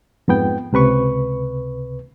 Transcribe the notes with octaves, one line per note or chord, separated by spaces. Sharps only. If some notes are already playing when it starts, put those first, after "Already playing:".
F2 G#2 B3 G5
C#2 C3 B4 C#6